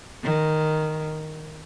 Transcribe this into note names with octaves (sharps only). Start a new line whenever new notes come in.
D#3